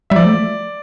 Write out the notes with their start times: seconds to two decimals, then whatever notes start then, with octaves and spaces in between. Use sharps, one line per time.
0.10 G3 E5
0.16 F3 D5
0.26 A3